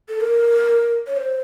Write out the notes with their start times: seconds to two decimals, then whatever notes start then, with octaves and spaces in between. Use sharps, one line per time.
0.09 A4
0.21 A#4
1.07 C#5
1.17 C5